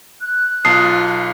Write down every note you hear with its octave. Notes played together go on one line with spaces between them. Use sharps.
F#6
B1 F4 A5 D#6 C7